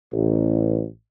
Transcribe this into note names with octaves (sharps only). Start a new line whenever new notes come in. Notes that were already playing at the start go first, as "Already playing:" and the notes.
A1